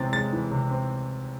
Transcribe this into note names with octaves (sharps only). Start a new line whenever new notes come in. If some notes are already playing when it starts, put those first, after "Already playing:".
Already playing: C3 E3 G#3 C4 A6
G#3 A6
E3
C3
C4